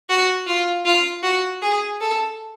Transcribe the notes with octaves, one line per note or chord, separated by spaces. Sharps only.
F#4
F4
F4
F#4
G#4
A4